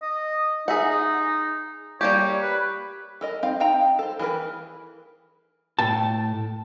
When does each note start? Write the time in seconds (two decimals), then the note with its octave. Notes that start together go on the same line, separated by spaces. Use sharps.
0.02 D#5
0.68 D#4 G#4 E5 F#5
2.01 G3 A#3 G4 C#5
2.42 B4
3.21 A4 A#4 D#5
3.43 C4 D#4 F5
3.60 C4 D#4 F5 G5 A#5
3.99 A4 C5
4.19 E3 G#4 A#4 B4
5.79 A2 G5 A5